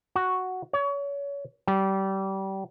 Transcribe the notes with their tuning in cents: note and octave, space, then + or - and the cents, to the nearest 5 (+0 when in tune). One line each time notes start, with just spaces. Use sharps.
F#4 +0
C#5 +30
G3 -25